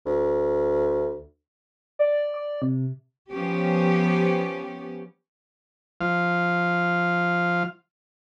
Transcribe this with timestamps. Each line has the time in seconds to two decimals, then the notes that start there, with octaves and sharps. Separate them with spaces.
0.06 D2
1.99 D5
2.34 D5
2.62 C3
3.31 F3 B3 C#4 G4
6.01 F3 F5